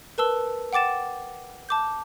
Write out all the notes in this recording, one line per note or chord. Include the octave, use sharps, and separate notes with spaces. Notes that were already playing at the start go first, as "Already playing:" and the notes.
A#4 B4 A5 E6 G7
F#5 G5 D6 A6 E7
A5 D6 G6